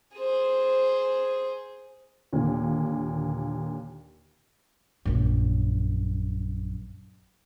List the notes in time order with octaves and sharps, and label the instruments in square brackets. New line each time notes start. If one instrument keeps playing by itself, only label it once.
[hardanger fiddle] G#4 C5
[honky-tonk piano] D#2 A#2 D3
[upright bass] A#1 F#2